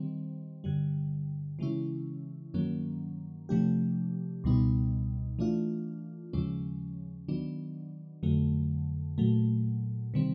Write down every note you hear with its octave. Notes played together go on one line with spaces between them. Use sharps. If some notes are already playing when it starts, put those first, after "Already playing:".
Already playing: D#3 G3 C4
G2 D3 G3
C#3 E3 G#3 C#4 E4
G2 D#3 F#3 A#3 C#4
C3 F3 A3 D4 G4
C#2 B2 G3 B3 D#4
E3 A3 D4 F4
D#2 C#3 F3 G#3 C#4
D#3 F#3 B3 D4
F2 D3 F#3 A3
A#2 F#3 A3
C3 D#3 G3 C4